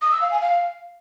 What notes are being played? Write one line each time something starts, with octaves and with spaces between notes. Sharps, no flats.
D#6
E6
F5
G#5
F5